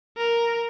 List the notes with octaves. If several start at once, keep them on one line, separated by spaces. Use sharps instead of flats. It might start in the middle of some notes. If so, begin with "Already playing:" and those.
A#4